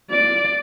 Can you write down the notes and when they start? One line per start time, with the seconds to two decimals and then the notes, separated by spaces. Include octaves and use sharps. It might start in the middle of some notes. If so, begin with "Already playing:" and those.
0.11 D5